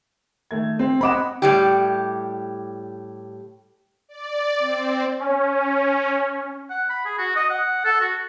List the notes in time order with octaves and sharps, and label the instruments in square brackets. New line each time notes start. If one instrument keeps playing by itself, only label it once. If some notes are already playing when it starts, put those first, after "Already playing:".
[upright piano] D#3 A3 G#6
C4
[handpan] C4 D#5 F#5 [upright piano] B5 D6 E7
[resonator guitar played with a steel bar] A2 G3 G4
[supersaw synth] D5
C4
C#4
[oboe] F#5
B5
G#4
F#4
D#5
F#5
A4
F#4